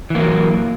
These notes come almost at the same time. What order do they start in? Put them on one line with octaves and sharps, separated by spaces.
E3 A#3 F#3